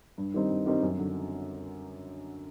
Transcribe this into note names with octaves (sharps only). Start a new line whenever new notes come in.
G2
D#3 G3 C4 D#4
G2
D#3 G3 C4 D#4
F#2
D3 F#3